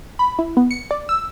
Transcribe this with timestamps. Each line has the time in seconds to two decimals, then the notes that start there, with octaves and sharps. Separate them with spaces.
0.19 B5
0.39 E4
0.57 B3
0.71 C#7
0.91 D5
1.09 E6